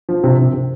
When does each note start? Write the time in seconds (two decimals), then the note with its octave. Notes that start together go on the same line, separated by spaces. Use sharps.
0.09 F3
0.24 C3
0.38 C3
0.54 C3